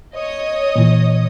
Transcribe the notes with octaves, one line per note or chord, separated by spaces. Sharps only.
C#5 D#5 D#6
A#2 E3